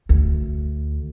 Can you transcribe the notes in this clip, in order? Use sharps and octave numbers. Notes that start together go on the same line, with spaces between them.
D2